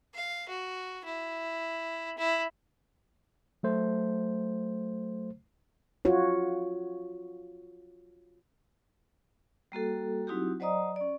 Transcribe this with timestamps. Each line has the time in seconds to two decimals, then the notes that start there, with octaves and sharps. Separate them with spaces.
0.14 F5
0.49 F#4
1.05 E4
2.18 E4
3.63 F#3 A3 C5
6.05 F4 F#4 C#5
9.72 G3 A#3 F#4 A4
10.27 F#3 C4 D#4 E4 F#4 G4
10.60 F#3 C5 D5 D#5 A#5 D#6
10.96 C#4 D5